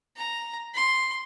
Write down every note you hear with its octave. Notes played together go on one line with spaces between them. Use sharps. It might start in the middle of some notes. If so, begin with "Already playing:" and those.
A#5
C6